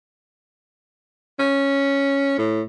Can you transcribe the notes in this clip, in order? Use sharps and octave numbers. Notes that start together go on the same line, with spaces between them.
C#4
A2